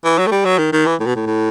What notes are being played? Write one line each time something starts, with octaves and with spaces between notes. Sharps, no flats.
E3
F#3
A3
G3
F#3
D#3
D#3
E3
A2
B2
A2
A2